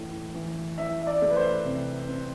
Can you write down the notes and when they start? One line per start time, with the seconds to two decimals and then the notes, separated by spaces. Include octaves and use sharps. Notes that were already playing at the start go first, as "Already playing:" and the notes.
Already playing: A2 E3 A3
0.34 E3
0.78 E3 E5
1.02 E5
1.07 D5
1.22 A3
1.30 B4
1.36 C5
1.65 C3
2.08 C4